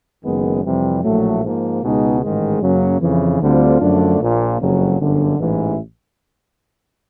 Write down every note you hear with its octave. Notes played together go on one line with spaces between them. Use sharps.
F#1 F#2 D#3 G#3 B3
F2 C3 E3 G3
A#1 A2 F#3 A3
G#2 F3 A#3
C#2 B2 G#3 B3 D#4
A1 G#2 D#3 G#3
F#2 C#3 F#3 A#3 C#4
F2 C#3 E3
D2 D3 G3 C4 F4
F#2 D3 F3 A3 D4
A#1 A#2 F3 A#3
F#1 F2 C#3 F#3
G1 F#2 D3
A1 G#2 E3